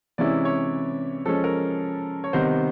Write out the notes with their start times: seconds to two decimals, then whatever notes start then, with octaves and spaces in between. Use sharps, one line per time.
0.18 C3 E3 G#3 C#4 E4 D5
0.45 C#5
1.26 F3 G#3 C#4 A4
1.44 A#4
2.24 C#5
2.33 C3 D#3 G3 B3 D#4 C5